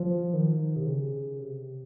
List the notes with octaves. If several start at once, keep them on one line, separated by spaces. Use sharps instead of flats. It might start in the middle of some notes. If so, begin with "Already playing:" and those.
Already playing: F3
D#3
C3
C#3
C3